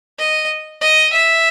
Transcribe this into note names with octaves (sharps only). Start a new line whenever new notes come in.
D#5
D#5
E5